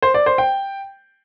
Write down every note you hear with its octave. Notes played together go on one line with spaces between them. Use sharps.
C5
D5
C5
G5